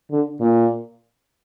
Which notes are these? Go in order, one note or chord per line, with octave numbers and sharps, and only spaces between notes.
D3
A#2